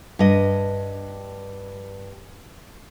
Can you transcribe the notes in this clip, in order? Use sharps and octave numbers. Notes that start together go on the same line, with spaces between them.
G2 D#5